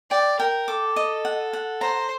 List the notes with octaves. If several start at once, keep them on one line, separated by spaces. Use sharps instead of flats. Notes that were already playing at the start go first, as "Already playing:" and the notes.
D5 G5
A#4 G5
A4 D6
D#5
F#5
F#5
C5 A#5